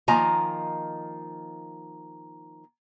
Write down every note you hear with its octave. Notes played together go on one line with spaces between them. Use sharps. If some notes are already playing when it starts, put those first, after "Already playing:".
D#3 F3 A#3 D#5 G#5 A#5